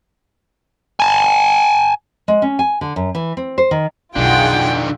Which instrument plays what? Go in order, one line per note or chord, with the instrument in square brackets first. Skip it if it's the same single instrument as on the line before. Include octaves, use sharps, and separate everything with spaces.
[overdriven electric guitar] G#5 A5
[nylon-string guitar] G#3
C#4
G#5
D3
F#2
E3
C4
C5
D#3
[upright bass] B1 F2 [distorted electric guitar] D3 D#3 [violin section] F4 G#4 F#5 [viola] G5